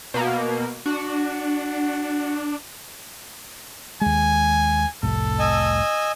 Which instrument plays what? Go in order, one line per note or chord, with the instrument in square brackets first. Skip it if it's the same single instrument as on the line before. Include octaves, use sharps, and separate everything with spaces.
[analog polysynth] B2 A#3
[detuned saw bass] D4 [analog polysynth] F#4
[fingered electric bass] D#2 G#3 [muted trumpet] G#5
[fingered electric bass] F1 C2 A2 [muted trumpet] A4
[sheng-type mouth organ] D#5 G#5 E6